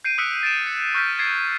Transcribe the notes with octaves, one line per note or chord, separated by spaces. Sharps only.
G6 C7 D7 D#7
D#6 E6 F#6 B6 C#7 D7
A6 D7 E7
C#7
C#6 F6 G6 A6 B6
G#6 A6 C7 D7